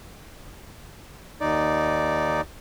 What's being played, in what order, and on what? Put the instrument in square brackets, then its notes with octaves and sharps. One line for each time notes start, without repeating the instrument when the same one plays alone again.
[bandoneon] D#2 D#4 D5